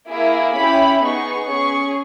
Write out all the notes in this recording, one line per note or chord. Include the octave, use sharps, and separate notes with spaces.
A#3 E4 G#4
C#4 E4 G4 B5
B3 D#4 G#4 C#6
C#4 G#4 C#6